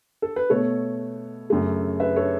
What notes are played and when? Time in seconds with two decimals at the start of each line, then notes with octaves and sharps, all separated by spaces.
0.22 A4
0.36 B4
0.50 B2 A3 A4 C#5
1.50 F#2 C#3 A3
2.00 B4 E5
2.16 A4 C#5